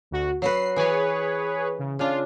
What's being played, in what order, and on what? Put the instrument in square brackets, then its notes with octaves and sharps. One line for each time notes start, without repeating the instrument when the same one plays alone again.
[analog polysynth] D2 F#4
[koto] F#3 F#4 B4 [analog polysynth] C7
[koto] E3 G#5 [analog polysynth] G#4 B4 C#5
[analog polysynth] C#3
[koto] C#3 D4 [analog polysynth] F4